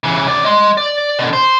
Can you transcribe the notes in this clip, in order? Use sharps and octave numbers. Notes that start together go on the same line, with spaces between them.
C#3 E3
F#2 D5
D#5 C6
D5
B2 D3
C5